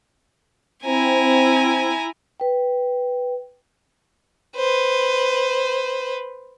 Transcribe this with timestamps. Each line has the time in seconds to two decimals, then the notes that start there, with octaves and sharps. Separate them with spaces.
0.85 C4 E4 G#5 A#5
2.40 B4 G5
4.56 B4 C5